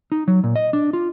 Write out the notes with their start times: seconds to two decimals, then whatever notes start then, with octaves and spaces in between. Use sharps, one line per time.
0.12 D#4
0.28 F#3
0.44 A#2
0.56 D#5
0.73 D4
0.93 F4